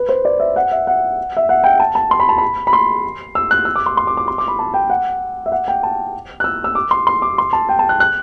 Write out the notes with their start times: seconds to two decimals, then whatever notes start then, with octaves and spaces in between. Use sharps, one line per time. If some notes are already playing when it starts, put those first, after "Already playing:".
Already playing: B4
0.09 C5
0.25 D5
0.40 E5
0.56 F#5
0.71 E5
0.87 F#5
1.37 E5
1.49 F#5
1.64 G5
1.80 A5
1.95 A5
2.11 C6
2.20 B5
2.29 A5
2.38 B5
2.67 B5
2.73 C6
3.35 E6
3.51 F#6
3.65 E6
3.76 D6
3.86 C6
3.97 C6
4.07 D6
4.17 D6
4.28 C6
4.38 D6
4.48 B5
4.59 A5
4.74 G5
4.90 F#5
5.46 E5
5.52 F#5
5.68 G5
5.83 A5
6.40 F#6
6.44 E6
6.64 E6
6.75 D6
6.91 C6
7.07 C6
7.22 D6
7.38 C6
7.53 A5
7.69 G5
7.79 A5
7.89 F#6
8.00 F#6